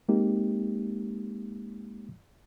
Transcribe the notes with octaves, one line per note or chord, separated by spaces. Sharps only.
G#3 A#3 C4 D#4 G4